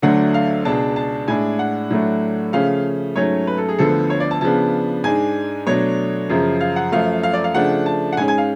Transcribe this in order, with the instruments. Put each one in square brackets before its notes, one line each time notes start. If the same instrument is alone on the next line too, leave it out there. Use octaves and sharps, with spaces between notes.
[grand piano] D2 D3 F#3 A3 D4 F#5
F5
C#2 B2 G#3 D4 A5
A5
A2 G#3 D4 G#5
F#5
A2 F#3 A3 D4
C#3 F3 A3 C#4 F5
G#2 F#3 A3 C#4 C#5
B4
A4
G#4
D2 D3 F3 B3 A4
C#5
D5
A5
C#3 F3 B3 D4 A5
G#2 G#3 D4 G#5
B2 F#3 A3 D4 C#5
F#2 C#3 F3
F5
F#5
F#2 F3 A3 F5
F5
D5
F5
C#3 F3 A3 D4 F#5
A5
F#5
G#2 G#3 C#4 G#5
G#5
F5